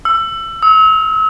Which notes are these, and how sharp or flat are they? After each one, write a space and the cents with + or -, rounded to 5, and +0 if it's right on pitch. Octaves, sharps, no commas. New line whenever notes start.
E6 +25
E6 -40